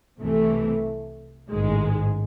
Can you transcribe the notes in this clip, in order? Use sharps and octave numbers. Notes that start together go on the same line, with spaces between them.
C2 C3 E3 A3
A1 G#2 D#3 G#3